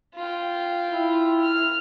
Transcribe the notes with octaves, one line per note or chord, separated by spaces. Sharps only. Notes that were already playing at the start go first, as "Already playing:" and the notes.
F4 G5
E4
F6